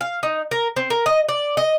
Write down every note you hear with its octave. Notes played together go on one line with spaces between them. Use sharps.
F5
D#4
A#4
C4
A#4
D#5
D5
D#5